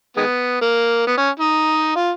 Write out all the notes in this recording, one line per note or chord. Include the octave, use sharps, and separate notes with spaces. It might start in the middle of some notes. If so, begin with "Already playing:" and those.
D#3 G#3 B3
A#3
B3
C#4
D#4
F4